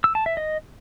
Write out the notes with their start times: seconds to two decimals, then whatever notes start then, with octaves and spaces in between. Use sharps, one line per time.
0.04 E6
0.15 A5
0.26 E5
0.37 D#5